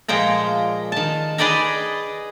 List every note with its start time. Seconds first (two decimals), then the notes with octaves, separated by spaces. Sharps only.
0.08 A#2 F3 G#3 G5 A#5
0.92 D#3 A5
1.38 G#4 B4 D5 D#5 G5 A#5